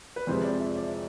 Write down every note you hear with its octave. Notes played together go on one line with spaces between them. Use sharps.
B4
F2 C3 F3 G#3 C5
D5
E5
D5